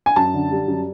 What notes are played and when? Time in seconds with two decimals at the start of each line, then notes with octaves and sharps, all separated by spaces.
0.06 G#5
0.16 F#2 A5
0.34 D3
0.51 G3
0.68 F#2